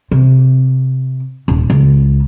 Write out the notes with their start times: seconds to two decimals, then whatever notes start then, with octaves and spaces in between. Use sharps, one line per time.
0.11 C3
1.48 D#1
1.70 C#2